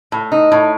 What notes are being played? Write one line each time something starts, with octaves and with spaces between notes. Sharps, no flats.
A2
D#4
A2